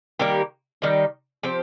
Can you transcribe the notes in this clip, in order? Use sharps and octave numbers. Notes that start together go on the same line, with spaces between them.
D#3 G3 A#3 G4
D#3 G3 D#4
F3 C4 G4